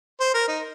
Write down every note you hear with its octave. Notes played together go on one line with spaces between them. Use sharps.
C5
A#4
D#4